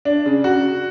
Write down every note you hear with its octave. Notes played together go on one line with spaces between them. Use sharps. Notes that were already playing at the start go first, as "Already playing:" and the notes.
D4
C#3
F#4